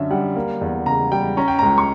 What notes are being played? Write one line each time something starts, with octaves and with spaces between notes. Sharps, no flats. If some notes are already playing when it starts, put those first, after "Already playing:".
Already playing: F#2 D3 C#4 E5
G3 F#5
A#3
E2
C#3 A#5
G3 G5
C#4 A#5
G5
C#2 A#5
C#6